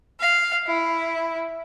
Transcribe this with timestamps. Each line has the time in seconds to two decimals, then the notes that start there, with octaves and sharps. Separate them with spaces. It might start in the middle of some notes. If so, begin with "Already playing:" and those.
0.18 F5
0.66 E4